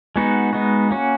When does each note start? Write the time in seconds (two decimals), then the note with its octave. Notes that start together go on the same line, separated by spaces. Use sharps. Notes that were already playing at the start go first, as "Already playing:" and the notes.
0.16 G#3 B3 D#4 F#4
0.53 G#3 B3 D#4 F#4
0.91 A#3 C#4 F#4